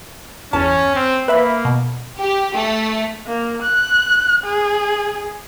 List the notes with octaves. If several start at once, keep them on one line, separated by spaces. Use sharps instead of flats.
G1 E2 C#4 A5
C4
A#3 B4 E5 B5
B2
G4
A3
A#3
F#6
G#4